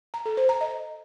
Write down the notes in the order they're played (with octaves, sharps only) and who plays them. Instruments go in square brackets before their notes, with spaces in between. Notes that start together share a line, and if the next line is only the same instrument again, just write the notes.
[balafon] A#5
A4
C5
A#5
D#5